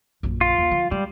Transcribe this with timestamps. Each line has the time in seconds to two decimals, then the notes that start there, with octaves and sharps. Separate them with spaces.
0.23 A#1 F#2
0.41 F4
0.58 D#2
0.71 D3 F3
0.91 G3 G#3